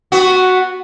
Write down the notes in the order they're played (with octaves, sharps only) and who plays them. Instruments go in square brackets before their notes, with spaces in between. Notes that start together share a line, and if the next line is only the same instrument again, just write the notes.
[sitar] B3 F#4